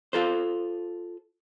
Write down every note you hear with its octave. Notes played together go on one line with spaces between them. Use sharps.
F4 A4 C5